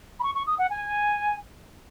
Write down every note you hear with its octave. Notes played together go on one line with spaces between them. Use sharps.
B5
C#6
C#6
D#6
F#5
G#5